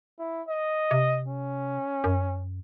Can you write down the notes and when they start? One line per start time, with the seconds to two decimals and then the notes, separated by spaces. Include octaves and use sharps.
0.19 E4
0.49 D#5
0.91 C3
1.28 C#4
2.04 F#2